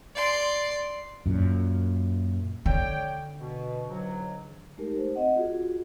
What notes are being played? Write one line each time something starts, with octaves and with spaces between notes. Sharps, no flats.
D5 C6
F#2 A#2
D3 C#5 D5 G5
B2
C#2 G#2 F#3
G#3 A3 D#4 G4 A#4
A3 C5
C4 D#5 F#5
F4 F#4 G#4